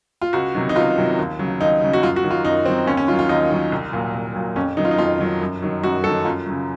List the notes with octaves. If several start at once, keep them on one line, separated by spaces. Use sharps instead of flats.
F4
C#2 F#4
C3 D#3 F#3
D#4
C#2 F4
C3 D#3 F#3
D#2
C#3 F#3
D#2 D#4
C#3 F#3
F#4
F#2 F4
F#4
D#3 F#3
F4
F#2 D#4
D#3 F#3 C4
D#2 C#4
C#4
D#3 F#3 F4
F4
D#2 D#4
D#3 F#3
C2
A#2 F#3
C2
A#2 F#3
F2 C#4
D#3 F#3 D#4
F4
D#4
F2 F4
D#3 F#3
F#2
D#3 F#3
F#2 F#4
D#3 F#3 A4
F#2 F4
C#3 F#3